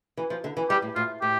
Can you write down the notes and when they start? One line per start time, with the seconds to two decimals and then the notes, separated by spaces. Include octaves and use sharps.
0.17 E3
0.30 F3
0.44 D3
0.57 E3
0.70 G3 G4
0.82 A2
0.96 A2 F4
1.22 A2 G4